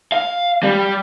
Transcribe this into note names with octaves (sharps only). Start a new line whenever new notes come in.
F5
G3